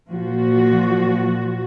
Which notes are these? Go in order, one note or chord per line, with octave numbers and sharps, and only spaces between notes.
A#2 F3 F#4